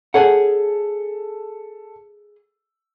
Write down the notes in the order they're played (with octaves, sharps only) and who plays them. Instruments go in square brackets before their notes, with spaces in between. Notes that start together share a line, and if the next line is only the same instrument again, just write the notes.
[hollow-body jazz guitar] G#4 C#5 F#5 [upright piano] A4